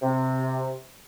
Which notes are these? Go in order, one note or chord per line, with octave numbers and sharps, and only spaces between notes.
C3